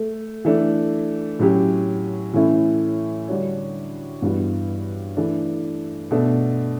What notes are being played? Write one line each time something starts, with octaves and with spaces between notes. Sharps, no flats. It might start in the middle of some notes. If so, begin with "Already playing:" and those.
Already playing: A3
E3 A3 D4
A2 F#3 C#4 G4
A2 E3 A3 C#4 E4
D3 G3 D4 F#4 C#5
G2 E3 G3 B3 F#4
E3 A3 D4
B2 A3 D4 A4